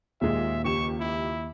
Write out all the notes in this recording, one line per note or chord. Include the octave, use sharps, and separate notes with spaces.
D#2 A#2 G#3 E5
C#2 G4 C#6 E7
E4